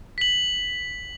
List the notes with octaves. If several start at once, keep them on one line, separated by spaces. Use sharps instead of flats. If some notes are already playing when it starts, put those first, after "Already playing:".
B6 F#7